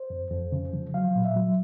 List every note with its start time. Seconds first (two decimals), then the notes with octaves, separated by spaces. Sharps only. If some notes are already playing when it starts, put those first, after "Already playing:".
Already playing: C5
0.10 F2
0.31 F2
0.52 C#3
0.73 F3
0.94 F#3 F5
1.15 A#2
1.25 E5
1.36 F#3